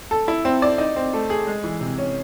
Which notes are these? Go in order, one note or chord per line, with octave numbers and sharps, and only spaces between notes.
A4
E4
C4
D5
D#4
C4
A3
G#4
G#3
E3
C3
C#4